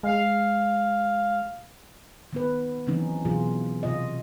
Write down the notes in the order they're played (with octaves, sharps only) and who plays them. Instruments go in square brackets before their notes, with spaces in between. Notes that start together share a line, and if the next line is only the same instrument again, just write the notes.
[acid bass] G#3 [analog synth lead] F5
[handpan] D#3 B3 B4
C#3 E3 F#3 C4 C#4 D#4
B2 E3 F#3 F4 G#4
C3 F4 D#5